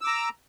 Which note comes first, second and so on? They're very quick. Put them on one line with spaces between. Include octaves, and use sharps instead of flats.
E6 D6 A#5